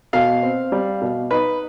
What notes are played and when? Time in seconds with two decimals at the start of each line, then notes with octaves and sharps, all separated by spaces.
0.13 B2 F5
0.43 C4
0.72 G3
1.01 B2
1.31 D#4 B4